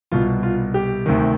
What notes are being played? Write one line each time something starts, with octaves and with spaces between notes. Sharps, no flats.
C2 B2 F4
F4
G4
D2 C3 D#3